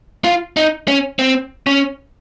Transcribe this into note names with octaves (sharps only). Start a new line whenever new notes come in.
F4
D#4
C#4
C4
C#4